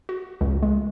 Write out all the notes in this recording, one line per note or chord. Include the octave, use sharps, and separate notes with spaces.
F#4
C#2
G#3